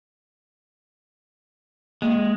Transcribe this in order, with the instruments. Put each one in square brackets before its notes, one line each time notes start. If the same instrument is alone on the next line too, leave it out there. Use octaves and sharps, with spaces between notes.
[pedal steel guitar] G#3 [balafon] A#3